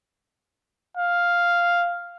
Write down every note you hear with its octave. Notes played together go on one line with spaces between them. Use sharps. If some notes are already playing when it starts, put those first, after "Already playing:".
F5